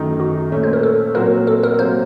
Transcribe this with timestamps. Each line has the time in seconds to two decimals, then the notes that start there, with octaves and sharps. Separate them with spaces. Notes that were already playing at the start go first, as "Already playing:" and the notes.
Already playing: F#2 D#3 A3 D#4
0.20 F#4
0.52 A#2 A3 C#4
0.63 C5
0.73 A#4
0.83 A4
1.15 A#2 F#3 C4 F#4 A#4
1.47 A4
1.63 A#4
1.79 C3 F#3 A#3 C5